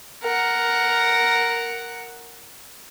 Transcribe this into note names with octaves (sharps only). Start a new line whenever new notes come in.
A#4 F#5